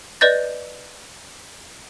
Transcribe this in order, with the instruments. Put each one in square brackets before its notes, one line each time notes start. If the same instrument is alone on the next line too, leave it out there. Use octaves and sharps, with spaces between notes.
[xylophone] B4 D5 D#5 G6 A6